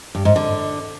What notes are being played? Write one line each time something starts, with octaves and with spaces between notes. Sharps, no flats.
G2
G#2
D3